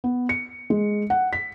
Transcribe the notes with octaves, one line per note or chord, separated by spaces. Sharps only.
B3
C#7
G#3
F#5
B6